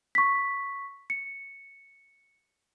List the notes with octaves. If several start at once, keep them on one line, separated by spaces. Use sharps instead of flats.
C#6 B6
C#7